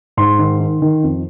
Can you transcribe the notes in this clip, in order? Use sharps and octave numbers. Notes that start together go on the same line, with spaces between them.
G#2 C6
D#3
D#3
D#3
F2